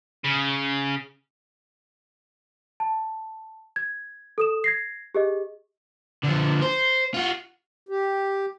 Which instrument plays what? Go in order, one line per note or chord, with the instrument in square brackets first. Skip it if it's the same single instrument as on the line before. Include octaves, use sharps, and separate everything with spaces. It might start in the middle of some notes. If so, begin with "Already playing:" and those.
[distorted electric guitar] C#3
[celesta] A5
G#6
A4 D#6 E7
G#6 A#6 C7
G4 G#4 D#5
[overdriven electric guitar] D3 F3
C5
F4 F#4
[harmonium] G4